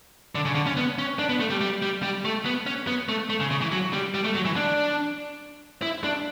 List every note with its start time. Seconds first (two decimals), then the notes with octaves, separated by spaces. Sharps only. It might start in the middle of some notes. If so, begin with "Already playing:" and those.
0.35 D3
0.45 C#3
0.55 D3
0.67 C#4
0.77 B3
0.98 C#4
1.19 D4
1.29 B3
1.40 A3
1.50 G3
1.61 G3
1.82 G3
2.03 G3
2.25 A3
2.46 B3
2.66 C#4
2.87 B3
3.09 A3
3.30 A3
3.40 C#3
3.51 C#3
3.61 E3
3.72 F#3
3.93 G3
4.14 G3
4.24 A3
4.35 F#3
4.45 E3
4.56 D4
5.82 E4
6.04 D4